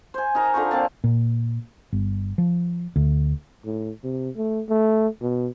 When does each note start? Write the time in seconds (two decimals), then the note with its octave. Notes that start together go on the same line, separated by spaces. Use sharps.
0.14 C5 G#5
0.35 D#4 A#4 A#5
0.54 D3 F4 A#5 C#6
0.71 A#2 C4 A5
1.04 A#2
1.92 G1
2.38 F3
2.96 D2
3.65 A2
4.04 C3
4.36 A3
4.69 A3
5.22 B2